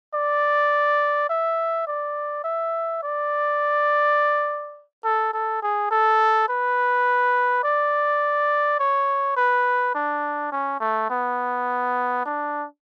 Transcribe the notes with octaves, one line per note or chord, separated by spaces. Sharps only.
D5
E5
D5
E5
D5
A4
A4
G#4
A4
B4
D5
C#5
B4
D4
C#4
A3
B3
D4